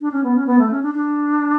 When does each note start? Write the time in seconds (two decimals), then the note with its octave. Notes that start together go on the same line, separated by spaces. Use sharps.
0.01 D4
0.11 C#4
0.23 B3
0.35 C#4
0.46 B3
0.59 A3
0.71 C#4
0.82 D4
0.94 D4